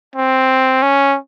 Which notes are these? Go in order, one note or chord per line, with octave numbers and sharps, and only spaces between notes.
C4
C#4